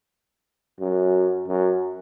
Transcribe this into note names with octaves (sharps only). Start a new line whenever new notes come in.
F#2
F#2